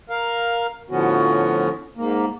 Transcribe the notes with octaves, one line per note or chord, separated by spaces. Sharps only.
A#4 F5
A2 D3 F3 B3 C#4 F#4
G#2 A#3